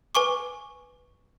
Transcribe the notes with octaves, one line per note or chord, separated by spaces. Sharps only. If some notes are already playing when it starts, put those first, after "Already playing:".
B4 G#5 C#6 D6